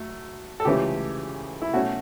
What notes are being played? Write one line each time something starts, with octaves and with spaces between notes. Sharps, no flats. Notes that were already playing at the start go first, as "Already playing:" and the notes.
Already playing: F#3 A3
A4
C#2 C#3 E3 A3 C#4 G4
E4
B2 A3 C#4 F#4